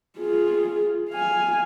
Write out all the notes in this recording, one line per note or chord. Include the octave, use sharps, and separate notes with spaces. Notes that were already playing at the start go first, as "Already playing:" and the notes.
F4 G#4
F5 G#5